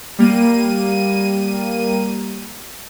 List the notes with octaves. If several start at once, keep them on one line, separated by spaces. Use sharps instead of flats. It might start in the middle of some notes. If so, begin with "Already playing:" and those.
G3 A#3 D#7